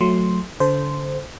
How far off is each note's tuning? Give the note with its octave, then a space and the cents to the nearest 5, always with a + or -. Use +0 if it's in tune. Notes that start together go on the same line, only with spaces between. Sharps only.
F#3 -20 A3 +0 C6 +0
D3 -35 A4 -15 C5 -10